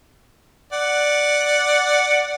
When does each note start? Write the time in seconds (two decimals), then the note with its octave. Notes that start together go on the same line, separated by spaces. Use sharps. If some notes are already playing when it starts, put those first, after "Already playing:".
0.73 D5 F#5